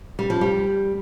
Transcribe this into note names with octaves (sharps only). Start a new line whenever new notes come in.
G3
F3
G3